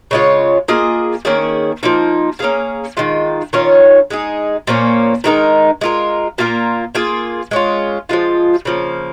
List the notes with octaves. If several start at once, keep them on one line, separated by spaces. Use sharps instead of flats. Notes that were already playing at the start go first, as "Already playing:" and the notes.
C#3 G#3 F4 C#5
A#3 F4 G#4 D#5
D#3 A#3 C#4 G#4
F3 A#3 D#4
A#3 C#4 G#4 F5
D#3 G#3 F4
D#3 C#4 F4 C#5
G#3 D#4 G#4
A#2 F3 A#3 C#4
D#3 G#3 D#4 A#4
G#3 F4 A#4
A#2 A#3 F4 A#4
A#3 F4 G#4
G#3 C#4 F4
F3 G#3 F4
C#3 F3 A#3